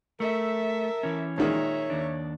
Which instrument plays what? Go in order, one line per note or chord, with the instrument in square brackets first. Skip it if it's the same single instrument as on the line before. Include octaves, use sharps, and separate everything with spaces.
[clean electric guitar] A3 [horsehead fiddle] A4 E5 [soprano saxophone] A#4
[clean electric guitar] E3 C#4
[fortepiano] A#2 D#3 G#3 [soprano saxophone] C#5 [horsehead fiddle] E5 A#5
[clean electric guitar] D#2 D4